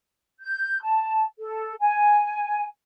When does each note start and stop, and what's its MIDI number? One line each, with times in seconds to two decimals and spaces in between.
0.40 0.82 91
0.82 1.23 81
1.39 1.73 69
1.80 2.64 80